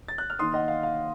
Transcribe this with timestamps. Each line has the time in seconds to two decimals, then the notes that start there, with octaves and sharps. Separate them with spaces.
0.08 A6
0.18 F#6
0.30 F6
0.39 D#3 A#3 D#4 C6 D#6
0.54 D#5 F#5
0.68 F5
0.83 F5